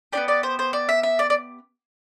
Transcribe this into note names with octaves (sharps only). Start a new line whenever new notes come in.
B3 D4 G4 D5
D5
C5
C5
D5
E5
E5
D5
D5